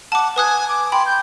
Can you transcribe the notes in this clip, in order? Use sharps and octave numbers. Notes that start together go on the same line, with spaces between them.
F#5 A5 D6
B4 G#5 D#6 F#6
D6
G5 B5 C6
G6